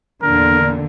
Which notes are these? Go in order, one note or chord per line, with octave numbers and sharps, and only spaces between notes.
E2 A#2 D3 A#4